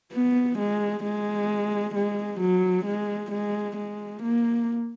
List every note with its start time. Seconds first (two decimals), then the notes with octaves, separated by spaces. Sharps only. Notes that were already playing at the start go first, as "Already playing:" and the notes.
0.13 B3
0.58 G#3
1.04 G#3
1.95 G#3
2.40 F#3
2.85 G#3
3.31 G#3
3.77 G#3
4.22 A#3